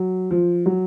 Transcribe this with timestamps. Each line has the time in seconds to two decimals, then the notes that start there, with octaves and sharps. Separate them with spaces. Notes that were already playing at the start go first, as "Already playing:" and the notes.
Already playing: F#3
0.31 F3
0.66 F#3